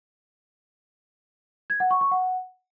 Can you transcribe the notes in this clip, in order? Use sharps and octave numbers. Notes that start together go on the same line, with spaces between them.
G#6
F#5
C#6
C#6
F#5